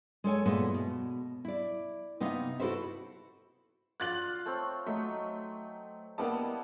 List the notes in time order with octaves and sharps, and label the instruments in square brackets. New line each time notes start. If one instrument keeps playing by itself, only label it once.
[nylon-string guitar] G#3 A4 C#5 G#5
A#2 G#3 B3 E4 A4
B2
E4 D5
C3 B3 D#4 F5
E4 F#4 A4 B4 C5 E5
[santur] F4 D5 [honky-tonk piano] F#6 A6 F#7
[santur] A3 C4 C#5
[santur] F#3 D#4 [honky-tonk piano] A3
[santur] G3 E4 D#5 [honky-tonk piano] A#3 B3 A5